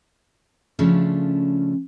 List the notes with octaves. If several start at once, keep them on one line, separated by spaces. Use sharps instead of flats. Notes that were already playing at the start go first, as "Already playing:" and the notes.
C#3 F3 A3 C#4 D4